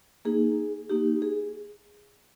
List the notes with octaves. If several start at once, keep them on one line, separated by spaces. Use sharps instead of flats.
A#3 D#4 G#4
A#3 D#4 G4
G#4